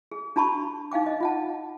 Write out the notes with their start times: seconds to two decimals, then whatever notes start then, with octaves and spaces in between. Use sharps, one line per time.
0.12 G#4
0.36 D4 F#4 A5 B5 C#6
0.92 D#4 F5 G5 D6
1.07 D#5
1.20 F4 F#5 A5